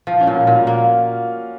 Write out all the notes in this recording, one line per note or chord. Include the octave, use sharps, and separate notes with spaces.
F3 F4
C#4
A#2
F#4
A#2 F4
A#3